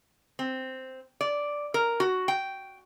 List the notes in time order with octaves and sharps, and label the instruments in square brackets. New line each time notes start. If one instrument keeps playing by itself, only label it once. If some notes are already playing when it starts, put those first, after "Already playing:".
[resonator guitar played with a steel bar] C4
D5
A#4
F#4
G5